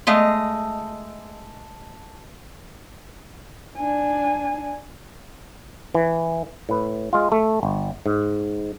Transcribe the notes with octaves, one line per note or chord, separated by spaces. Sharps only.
G#3 A3 D#5 F5
D4 G#5
E3
A2 B4
G#3 F4
A3
G1
G#2